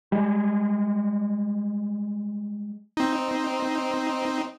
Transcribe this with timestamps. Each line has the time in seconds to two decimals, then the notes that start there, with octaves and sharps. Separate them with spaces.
0.12 G3 G#3
2.97 C4 D#4